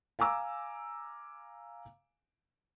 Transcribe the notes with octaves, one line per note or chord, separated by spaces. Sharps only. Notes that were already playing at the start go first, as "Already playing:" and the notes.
F5 G#5 A#5 D6 E6